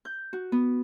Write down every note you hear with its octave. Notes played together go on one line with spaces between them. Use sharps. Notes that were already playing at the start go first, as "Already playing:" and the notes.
G6
F#4
B3